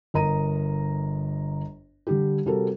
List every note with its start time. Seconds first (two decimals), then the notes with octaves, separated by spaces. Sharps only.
0.14 G1 A#4 D#5 A#5 D#7
2.07 D3 G3 G4
2.46 C3 G3 F#4 A4 A#4